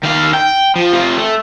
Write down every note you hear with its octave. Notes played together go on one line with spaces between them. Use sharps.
D#3 F5
G5
F3
C3 F4
A3